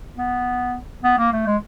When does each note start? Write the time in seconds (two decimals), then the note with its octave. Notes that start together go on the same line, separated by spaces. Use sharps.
0.18 B3
1.04 B3
1.19 A#3
1.33 A3
1.47 G#3